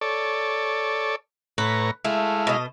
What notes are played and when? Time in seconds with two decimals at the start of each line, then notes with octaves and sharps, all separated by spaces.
0.01 A4 C#5 D5
1.58 A2 B4 C#5 A#5
2.05 G#3 A3 E4 F5
2.47 B2 D#5